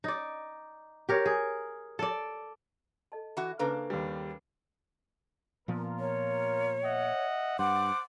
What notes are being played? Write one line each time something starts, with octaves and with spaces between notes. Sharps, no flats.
D#4 D5
G4 A#4 C#5
G#4
A4 D5
A4 D#5 A5
E3 F#4
C#3 A#3 D4 A4 B4 C5
D#2 G3
A#2 F3 B3 F4 A#4
C#5
D#5 E5 F#5
G2 C5 F#5 D6